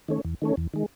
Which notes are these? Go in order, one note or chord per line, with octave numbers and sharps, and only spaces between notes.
D#3 A3 C#4
E2
D#3 A3 C#4
E2
D#3 G#3